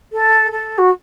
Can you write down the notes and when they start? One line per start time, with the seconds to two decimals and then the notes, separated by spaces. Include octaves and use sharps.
0.12 A4
0.51 A4
0.78 F#4